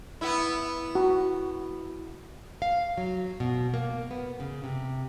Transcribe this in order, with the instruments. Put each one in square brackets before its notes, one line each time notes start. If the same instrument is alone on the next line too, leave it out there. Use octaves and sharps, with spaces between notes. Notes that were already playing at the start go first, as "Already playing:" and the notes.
[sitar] B3 E4
[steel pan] F#4
[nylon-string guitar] F5
F#3
B2
A#3
B3
C#3
C3